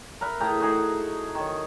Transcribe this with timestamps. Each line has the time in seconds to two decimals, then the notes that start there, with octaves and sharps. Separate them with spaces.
0.21 A#4 E5 F#5 B5
0.40 A2 G#4 G5 A#5
0.60 D#4 F#4 G#4
1.35 D#3 C#5